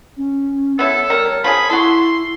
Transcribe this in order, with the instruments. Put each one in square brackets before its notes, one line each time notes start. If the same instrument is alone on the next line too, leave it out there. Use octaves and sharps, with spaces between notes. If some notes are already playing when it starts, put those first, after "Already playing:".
[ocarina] C#4
[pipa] B3 E4 [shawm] A4 [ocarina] C#5
[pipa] G3 A#4
[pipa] F3 F4 G#4 [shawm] B5
[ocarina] E4 [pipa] F#4 A4 [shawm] C6